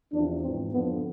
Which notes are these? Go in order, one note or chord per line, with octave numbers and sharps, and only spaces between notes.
E2 C3 F3 D4
G#2 E3 C4
F2 D3 F3 B3